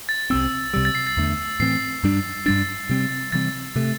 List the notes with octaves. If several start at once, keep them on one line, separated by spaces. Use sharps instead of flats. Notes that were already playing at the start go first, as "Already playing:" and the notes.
A6
C2 C3 A3 C4 E6
C2 C3 G3 E6
A6
C7
A6
E2 D3 A3
A2 E3 C4 C7
G2 G3 D4
G2 G3 D4 A6
C3 G3 C4
C3 E3 G3 C4 A6
C3 A3